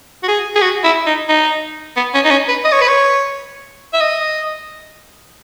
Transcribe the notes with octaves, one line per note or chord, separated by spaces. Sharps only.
F#4
G#4
G#4
F#4
E4
D#4
D#4
B3
C#4
D#4
C#4
B4
D#5
C#5
B4
C#5
E5
D#5